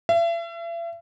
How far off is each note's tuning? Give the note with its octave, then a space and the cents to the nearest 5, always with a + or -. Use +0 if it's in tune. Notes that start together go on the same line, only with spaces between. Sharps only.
E5 +40